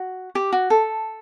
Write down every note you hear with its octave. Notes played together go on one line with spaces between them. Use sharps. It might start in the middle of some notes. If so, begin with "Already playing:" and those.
Already playing: F#4
G4
F#4
A4